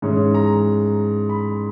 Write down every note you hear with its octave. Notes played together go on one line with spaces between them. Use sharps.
G#2 E3 G#3 C#4
A#5
B5